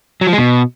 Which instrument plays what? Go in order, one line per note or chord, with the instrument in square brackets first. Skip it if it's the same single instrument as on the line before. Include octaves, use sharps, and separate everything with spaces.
[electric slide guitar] F#3
F3
G#3
B2